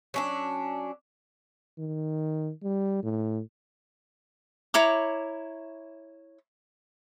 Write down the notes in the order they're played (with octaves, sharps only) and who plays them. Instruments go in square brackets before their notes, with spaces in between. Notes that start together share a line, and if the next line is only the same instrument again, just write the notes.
[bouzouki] F#3 C#4 D4
[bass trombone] D#3
G3
A2
[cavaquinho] E4 C#5 A#5 D6